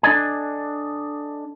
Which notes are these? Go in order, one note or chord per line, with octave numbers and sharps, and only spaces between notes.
D4 A4 D5 D#5 G#5